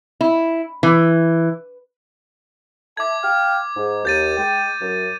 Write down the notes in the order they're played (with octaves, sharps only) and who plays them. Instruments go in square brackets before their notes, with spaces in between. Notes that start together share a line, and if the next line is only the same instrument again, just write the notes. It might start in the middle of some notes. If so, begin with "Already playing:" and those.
[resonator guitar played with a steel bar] E4
E3
[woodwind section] E5 A5 [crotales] D6 G#6
[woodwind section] F5 G5 F6
G#2
[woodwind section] D#2 [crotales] G6 A6 D#7
[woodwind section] G#3 G5
F#2